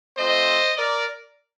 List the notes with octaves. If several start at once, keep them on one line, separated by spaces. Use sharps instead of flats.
A3 C4 F4 C5 D#5
A#4 D5